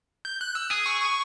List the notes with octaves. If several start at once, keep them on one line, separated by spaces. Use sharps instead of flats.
G6
F#6
E6
G#4 D#6
C#6
C#6